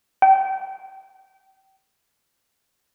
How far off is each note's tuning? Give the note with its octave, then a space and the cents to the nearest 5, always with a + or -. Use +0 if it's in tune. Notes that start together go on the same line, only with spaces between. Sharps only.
G5 -25